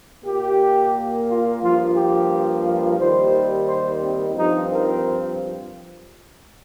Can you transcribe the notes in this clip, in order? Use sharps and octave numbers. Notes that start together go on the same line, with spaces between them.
A#2 A#3 G4
F4
G2 F3 A#3 F4
G4
D#2 D#3 G3 C5
C5
C4
G2 F3 C4 D#4
A#4